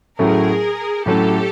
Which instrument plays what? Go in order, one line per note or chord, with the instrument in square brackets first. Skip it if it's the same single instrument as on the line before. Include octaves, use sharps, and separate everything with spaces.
[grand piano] A2 F#3 A3 C#4 [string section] G#4 A#4
[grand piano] A2 F#3 A3 C#4 [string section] G4 A4